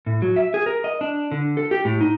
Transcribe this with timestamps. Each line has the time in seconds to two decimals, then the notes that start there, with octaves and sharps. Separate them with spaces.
0.06 A2
0.22 F#3
0.36 E5
0.54 G#4
0.66 A#4
0.84 D#5
1.01 D4
1.32 D3
1.57 A4
1.71 G4
1.85 A2
2.01 D#4